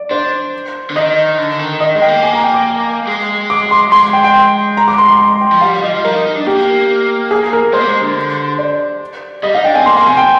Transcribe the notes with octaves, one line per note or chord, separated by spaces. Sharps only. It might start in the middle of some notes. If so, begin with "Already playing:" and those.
Already playing: D5
D4 C5
D3
D#3 D#5
D3
D#3
D#3 D#5
G#3
G5
A#3
G#5
A#5
G5
D6
G#3
D6
C6
G#3 C6
G5
G5
A#5
D6
C6
C6
C6
G5
F3
G3 F5
F3 D#5
F3
G3 A#4
D#4
D#4
D4
A#3 G4
G#4
A#4
G#3 C5
A#3
G#3
D3
D5
G3 D#5
D#4 F5
D4 G5
C4 G#5
A#3 C6
A#3 C6
C3 G#5
G5